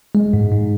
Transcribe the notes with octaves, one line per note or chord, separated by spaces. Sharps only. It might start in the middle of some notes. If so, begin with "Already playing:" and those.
G#3
G#2
G#2